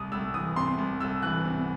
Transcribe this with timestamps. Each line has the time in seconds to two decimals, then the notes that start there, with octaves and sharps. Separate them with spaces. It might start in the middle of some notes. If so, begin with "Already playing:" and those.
Already playing: C2 D#6
0.12 C2 E6
0.34 E3 D#6
0.56 C3 C6
0.78 C2
1.00 C2 E6
1.23 E3 F#6
1.45 C3